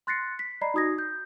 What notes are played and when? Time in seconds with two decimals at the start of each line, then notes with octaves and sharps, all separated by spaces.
0.07 C6 F#6 A6 A#6 C7 C#7
0.39 B6
0.61 D5 D#5 A#5 B5 C7
0.74 D#4 F#4 D#6 G#6 A#6
0.98 G6